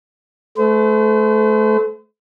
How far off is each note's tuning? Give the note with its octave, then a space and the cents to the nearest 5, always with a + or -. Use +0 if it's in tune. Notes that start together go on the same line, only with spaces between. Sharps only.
A3 -30 C5 -45